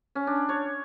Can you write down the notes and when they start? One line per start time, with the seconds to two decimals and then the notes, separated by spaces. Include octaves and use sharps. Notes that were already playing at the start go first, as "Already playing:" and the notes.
0.15 C#4
0.27 D4
0.49 C#5